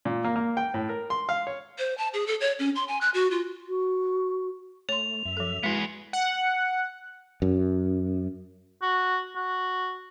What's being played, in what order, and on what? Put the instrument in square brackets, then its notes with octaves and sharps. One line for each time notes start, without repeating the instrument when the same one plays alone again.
[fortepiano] A#2
A#3
A#3
G5
A2
A#4
C6
F5
C#5
[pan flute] C5
A5
G#4
A4
C#5
C#4
C6
G#5
F#6
F#4
F4
[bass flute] F#4
[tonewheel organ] A3 [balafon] C#5 C6 [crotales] F7
[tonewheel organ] F#2 E5
[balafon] F3 A4
[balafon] G#3 E4 [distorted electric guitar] B3 G#4 [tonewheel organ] F#4 B4
[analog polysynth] F#5
[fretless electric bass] F#2
[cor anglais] F#4
F#4